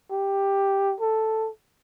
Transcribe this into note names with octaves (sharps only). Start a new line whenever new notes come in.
G4
A4